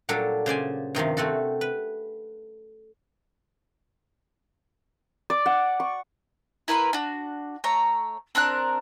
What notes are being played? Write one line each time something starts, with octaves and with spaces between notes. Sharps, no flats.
A#2 F#3 G3 D4 A4
C#3 C5 D5 G#5
G2 C3 D#3 F3
A3 C4 F#4 A4
B4
D5
F#5
C#6
E4 A#4 B4 C6
D4 F#4
A3 C#5 A#5
C4 D4 A#4 F#6